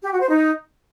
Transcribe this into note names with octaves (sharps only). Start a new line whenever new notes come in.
G4
F#4
C5
D#4